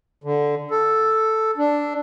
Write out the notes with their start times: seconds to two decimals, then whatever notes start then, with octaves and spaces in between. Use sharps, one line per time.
0.24 D3
0.71 A4
1.58 D4